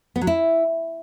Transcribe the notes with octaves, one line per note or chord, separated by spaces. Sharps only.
B3
F#3
E4